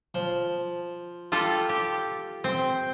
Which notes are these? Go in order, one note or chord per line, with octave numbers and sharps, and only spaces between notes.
F3
G3 F4 A4
G4
C4 G5 C6